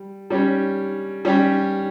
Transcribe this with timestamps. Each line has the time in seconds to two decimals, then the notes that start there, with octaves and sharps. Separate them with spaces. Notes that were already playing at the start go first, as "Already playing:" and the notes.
Already playing: G3
0.30 G3 C#4 G4 C#5
1.25 G3 C#4 G4 C#5